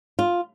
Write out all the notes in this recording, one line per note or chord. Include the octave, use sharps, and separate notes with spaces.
F4